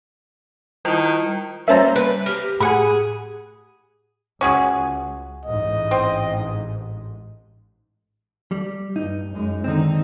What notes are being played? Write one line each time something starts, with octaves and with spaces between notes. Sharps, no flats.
D#3 G3 E4 F4
G3 A#3 C#4 C5 E5 A5 A#5
B4
G4 A#4
A2 G#4 F#5 G#5 B5
C#2 C#4 F#4 G#4
A1 G#2 D#5
C4
G3
G2 D#4
F#2 G#3
D3 D#3 C4 D#4